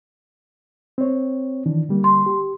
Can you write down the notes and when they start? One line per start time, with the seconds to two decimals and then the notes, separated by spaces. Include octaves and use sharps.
0.98 C4 C#5
1.66 D#3 E3 D4
1.89 D3 G3 A#3
2.04 C6
2.26 G4